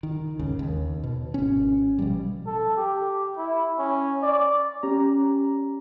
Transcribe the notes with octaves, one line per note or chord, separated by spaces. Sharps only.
D#3
D#2 G#2 C#3
D#2
B2
G#1 C#4
B2 F3 G3
A4
G4
E4
C#4
D5
C#4 G4 A#5